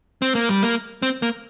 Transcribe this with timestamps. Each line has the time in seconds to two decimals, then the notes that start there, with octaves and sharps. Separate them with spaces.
0.22 C4
0.35 A#3
0.49 G3
0.63 A#3
1.02 C4
1.22 A#3